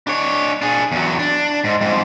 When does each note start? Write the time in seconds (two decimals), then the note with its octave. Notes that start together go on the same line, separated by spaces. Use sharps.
0.07 D4 C#5
0.62 D4 G#4
0.92 E2 F#3
1.19 D4
1.64 G#2
1.81 F2 G#2